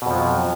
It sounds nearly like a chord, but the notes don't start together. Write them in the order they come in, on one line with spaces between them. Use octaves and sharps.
B2 F2 F3 F#3